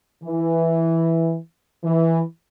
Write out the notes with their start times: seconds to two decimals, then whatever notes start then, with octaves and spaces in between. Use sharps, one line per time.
0.23 E3
1.83 E3